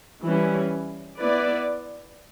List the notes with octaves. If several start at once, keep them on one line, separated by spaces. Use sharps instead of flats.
E3 G3 C#4
B3 E4 B4 D5